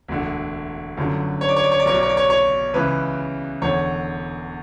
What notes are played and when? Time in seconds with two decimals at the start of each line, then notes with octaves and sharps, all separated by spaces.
0.08 E1 D2 D3
0.97 G1 F#2 D3
1.41 C#5
1.49 D5
1.56 C#5
1.64 D5
1.72 C#5
1.80 D5
1.86 B1 B2 C#5
1.94 D5
2.03 C#5
2.09 D5
2.17 C#5
2.30 C#5
2.73 C#2 C#3 E3 B4
3.62 E1 E2 D3 C#5